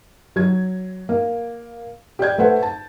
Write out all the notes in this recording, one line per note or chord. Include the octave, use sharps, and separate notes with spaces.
F#3 G#6
A#3
G4 D5 G6 G#6
A3 B4 C5 F#5
A5